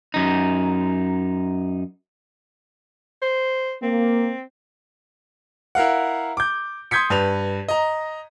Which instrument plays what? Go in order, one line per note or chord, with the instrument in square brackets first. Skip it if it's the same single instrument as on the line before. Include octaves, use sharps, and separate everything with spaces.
[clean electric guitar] F#2 D#4
[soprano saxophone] C5
[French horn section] A#3 [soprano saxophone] C4
[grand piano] E4 A#4 F5 F#5
D6 G6
C6 D#6 G6 G#6 B6 C#7
G2 B4 F7
D#5 A#5